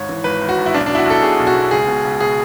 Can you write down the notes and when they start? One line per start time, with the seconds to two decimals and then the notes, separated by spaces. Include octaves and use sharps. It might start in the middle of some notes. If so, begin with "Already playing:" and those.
Already playing: G#1 G#2 C#5
0.09 E3
0.24 G#1 B4
0.42 G#1
0.49 F#4
0.58 G#2
0.66 E4
0.74 B1 D4
0.86 D4
0.90 B2
0.95 E4
0.98 F#4
1.06 B1 A4
1.22 B2 G#4
1.40 B1
1.47 F#4
1.55 B2
1.71 C#2 G#4
1.87 B2
2.05 C#2
2.21 B2 G#4